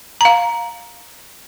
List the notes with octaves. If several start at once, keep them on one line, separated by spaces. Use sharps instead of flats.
F5 A#5